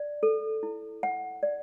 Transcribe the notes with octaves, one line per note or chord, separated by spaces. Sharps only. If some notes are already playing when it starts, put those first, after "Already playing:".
Already playing: D5
A4
E4
F#5
D5